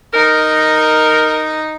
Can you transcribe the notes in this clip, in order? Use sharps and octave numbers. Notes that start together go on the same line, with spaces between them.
D#4 A#4